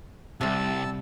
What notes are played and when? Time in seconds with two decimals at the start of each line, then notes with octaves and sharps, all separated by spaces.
0.41 C2 C3 G3 A5 E6